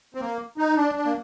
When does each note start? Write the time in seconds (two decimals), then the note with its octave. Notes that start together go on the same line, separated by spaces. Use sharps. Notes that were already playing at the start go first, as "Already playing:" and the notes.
0.15 C4
0.21 A#3
0.58 D#4
0.76 D4
0.95 D4
1.05 A#3